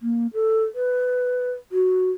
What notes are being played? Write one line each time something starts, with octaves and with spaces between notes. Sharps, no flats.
A#3
A4
B4
F#4